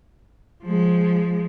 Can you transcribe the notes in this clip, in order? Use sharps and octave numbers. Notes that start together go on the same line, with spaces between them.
F3 G#3